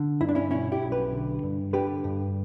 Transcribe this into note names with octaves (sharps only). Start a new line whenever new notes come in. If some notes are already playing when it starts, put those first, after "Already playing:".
Already playing: D3
G2 E4
D4
C#4 E4
B2 C#4 E4
E4 G4
B1
G4 B4
D3
G2
D3 G4 B4
G2